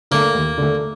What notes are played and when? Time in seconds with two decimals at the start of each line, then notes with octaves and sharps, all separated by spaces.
0.11 D3 A3 A#3
0.34 D#2
0.58 D3 A3